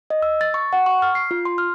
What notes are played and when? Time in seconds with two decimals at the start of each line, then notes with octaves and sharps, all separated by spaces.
0.10 D#5
0.22 E6
0.41 A6
0.54 C#6
0.73 F#5
0.86 C#6
1.02 F6
1.15 C7
1.31 F4
1.45 C6
1.58 F6